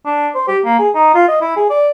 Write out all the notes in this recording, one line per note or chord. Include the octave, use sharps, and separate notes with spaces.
D4
C5
G4
A#3
G#4
D#4
F4
D#5
E4
G#4
D5